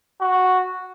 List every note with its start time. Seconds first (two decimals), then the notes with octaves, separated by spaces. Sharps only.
0.21 F#4